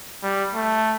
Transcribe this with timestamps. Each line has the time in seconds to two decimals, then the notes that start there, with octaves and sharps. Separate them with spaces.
0.23 G3
0.55 A3